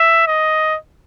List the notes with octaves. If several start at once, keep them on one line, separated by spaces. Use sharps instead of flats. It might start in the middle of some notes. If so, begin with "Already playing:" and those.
Already playing: E5
D#5